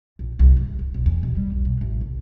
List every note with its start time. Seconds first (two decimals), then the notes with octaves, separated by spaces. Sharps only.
0.19 A#1
0.39 C2
0.57 F#1
0.79 D1
0.94 B1
1.06 E2
1.23 B2
1.37 G3
1.52 B1
1.65 B2
1.81 A1
2.01 C2